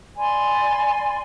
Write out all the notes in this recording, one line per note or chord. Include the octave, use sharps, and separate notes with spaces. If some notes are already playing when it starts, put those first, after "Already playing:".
D5 G#5 B5 C6